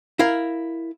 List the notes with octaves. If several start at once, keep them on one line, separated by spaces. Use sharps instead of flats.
E4 A#4 F5